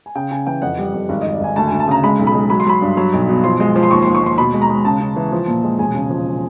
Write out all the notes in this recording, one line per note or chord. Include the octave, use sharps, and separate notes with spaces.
G#5
C#3 G5
C#3 G#5
E3 G5
F2 F#5
G3
F2
G#1
G#1 D#5
D5
G#1 G#5
D2 A5
D2 G#5
A5
C#3 A#5
G#3 B5
B1
B5
G#3
F#3 B5
C6
F#3 B5
G2
F#3
B1
B2
F3 C6
G#3
F3
C6
D#2 C#6
D#2 C6
C#6
D#2 C6
B2 B5
G#3
A#5
G#3
C#3 A5
C#3
E3
F3
A#2
G#3
E1 G#5
C#3
F3